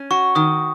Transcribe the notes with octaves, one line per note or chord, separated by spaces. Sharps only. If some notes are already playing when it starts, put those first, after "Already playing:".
Already playing: C#4
F#4 C#6
D#3 D#6